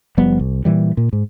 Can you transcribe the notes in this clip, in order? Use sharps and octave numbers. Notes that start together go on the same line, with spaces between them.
F#1 F3 G3 B3
C2
A#2 E3 G3
A#2
G#2